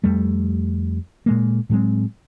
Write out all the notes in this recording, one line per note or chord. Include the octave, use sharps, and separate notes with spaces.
F2 G3 A3
A#2 G#3 A#3
A2 F#3 G#3 C4